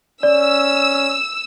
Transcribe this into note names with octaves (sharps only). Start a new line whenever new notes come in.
C#4 D5 E6